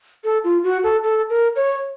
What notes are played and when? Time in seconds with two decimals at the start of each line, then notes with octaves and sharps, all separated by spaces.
0.24 A4
0.44 F4
0.64 F#4
0.84 A4
1.03 A4
1.30 A#4
1.56 C#5